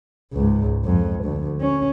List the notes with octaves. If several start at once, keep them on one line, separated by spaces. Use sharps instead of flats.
C#2 G#2
F2
D2
C#4